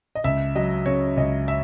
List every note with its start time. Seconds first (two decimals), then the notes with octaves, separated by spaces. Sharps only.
0.15 D#5
0.24 C#2 E5
0.56 F#3 D#5
0.86 C#3 C#5
1.17 C#2 D#5
1.48 E5